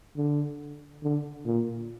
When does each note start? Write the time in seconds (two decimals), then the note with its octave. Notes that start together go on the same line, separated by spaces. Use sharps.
0.16 D3
1.03 D3
1.46 A#2